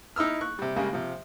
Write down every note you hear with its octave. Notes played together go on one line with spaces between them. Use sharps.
D#4 E4 E6 F6
C#6 F#6
C3 G3
C#3 G3 G#3 A#3
C3 F3